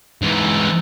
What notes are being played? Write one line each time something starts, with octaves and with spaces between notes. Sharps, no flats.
G#2 E3